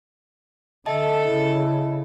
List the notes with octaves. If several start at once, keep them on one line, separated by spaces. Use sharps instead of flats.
D3 A4 D#5 E5 A5
C#3 E4